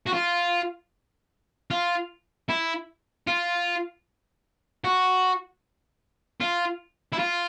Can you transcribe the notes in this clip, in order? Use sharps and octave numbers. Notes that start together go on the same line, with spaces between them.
F#4
F4
F4
E4
F4
F#4
F4
E4
F4